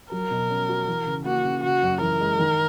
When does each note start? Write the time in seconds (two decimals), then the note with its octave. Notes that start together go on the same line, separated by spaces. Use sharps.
0.12 F#3 A#4
0.31 B2
0.50 C#4
0.69 F#4
0.88 E3
1.06 C#3
1.25 A#3 F#4
1.44 C#3
1.63 C#3 F#4
1.83 F#2
2.01 E3 A#4
2.20 G#3
2.39 D#3